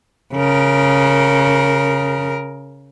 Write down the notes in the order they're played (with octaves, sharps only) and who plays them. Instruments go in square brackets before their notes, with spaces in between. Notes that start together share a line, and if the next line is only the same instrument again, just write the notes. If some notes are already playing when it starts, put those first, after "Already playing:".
[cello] C#3 A#4